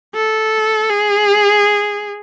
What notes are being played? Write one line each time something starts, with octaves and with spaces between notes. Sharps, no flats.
A4
G#4